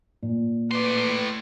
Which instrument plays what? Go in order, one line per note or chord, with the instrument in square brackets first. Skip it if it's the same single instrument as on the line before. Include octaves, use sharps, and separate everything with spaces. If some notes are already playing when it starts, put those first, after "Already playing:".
[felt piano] A#2
[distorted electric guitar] A2 C6 [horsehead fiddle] B4 D5